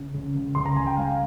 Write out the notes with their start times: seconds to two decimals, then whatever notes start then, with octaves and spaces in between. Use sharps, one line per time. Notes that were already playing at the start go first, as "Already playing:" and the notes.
Already playing: C#3
0.14 C#2
0.35 C#2
0.55 C#2 C6
0.66 A#5
0.76 C#2 G#5
0.87 G5
0.97 G#3 F5